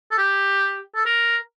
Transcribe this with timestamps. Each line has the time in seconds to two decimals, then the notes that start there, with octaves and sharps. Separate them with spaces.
0.11 A4
0.18 G4
0.96 A4
1.06 A#4